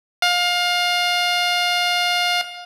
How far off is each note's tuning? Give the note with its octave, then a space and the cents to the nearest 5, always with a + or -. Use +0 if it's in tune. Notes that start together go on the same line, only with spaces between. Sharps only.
F5 +25